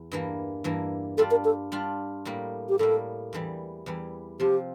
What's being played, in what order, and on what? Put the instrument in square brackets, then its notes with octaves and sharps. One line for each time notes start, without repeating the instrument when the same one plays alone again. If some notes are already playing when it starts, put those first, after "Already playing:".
Already playing: [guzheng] E2
G2 E3 A#3
G2 E3 A#3
[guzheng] G3 D4 F4 [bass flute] A4
[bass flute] A#4
A4
[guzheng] G3 D4 F4
A2 G3 A#3
[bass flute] G4
[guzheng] A2 G3 A#3 [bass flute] A4
[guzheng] E2 E3 G3
E2 E3 G3
[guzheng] C3 F3 C4 [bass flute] G4